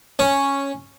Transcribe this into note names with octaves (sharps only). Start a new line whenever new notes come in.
C#4